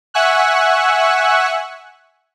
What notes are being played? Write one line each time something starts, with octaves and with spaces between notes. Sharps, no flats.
E5 F#5 G#5 C#6 E6 F#6